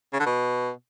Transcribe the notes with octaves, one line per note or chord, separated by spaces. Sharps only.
C#3
D3
B2